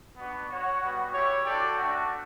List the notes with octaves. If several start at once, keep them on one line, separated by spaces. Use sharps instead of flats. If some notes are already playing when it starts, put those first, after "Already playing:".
B3 D4 F#4
F#4 C#5 F#5
G3 B3 F#4
E4 G4 C#5
D4 F#4 A4 D5 G5
A3 D4 F#4